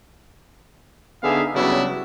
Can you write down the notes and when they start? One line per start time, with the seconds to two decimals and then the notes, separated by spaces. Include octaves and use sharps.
1.23 D3 B3 D#4 G#4 E5 F5
1.55 C#3 F#3 G3 B3 D4 E4